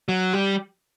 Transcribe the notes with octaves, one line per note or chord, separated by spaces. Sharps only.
F#3
G3